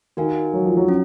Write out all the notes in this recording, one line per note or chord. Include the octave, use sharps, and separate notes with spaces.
D#3 F#4 A#4 F5 G#5
F#3
F3
F#3
C#4